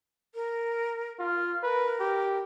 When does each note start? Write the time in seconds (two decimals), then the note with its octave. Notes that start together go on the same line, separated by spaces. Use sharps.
0.35 A#4
1.20 F4 F6
1.63 A#4 B4
2.00 G4